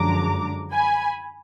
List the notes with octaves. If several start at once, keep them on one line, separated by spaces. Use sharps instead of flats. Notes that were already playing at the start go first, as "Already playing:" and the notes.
Already playing: F#2 D3 F3 G#3 D4 A#5 D6
G#5 B5